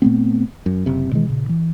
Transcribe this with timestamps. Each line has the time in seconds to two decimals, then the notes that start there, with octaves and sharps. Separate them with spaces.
0.02 A#2 A3 B3 C4
0.66 F#2
0.86 F#1 C3
1.12 B2 D#3 E3 G#3
1.27 A#2 C#3
1.49 E3